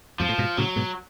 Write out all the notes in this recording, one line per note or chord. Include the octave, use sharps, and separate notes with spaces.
F2 G#2 F3
A2
G#2 B2
A2 C#3 F#3
G#2 B2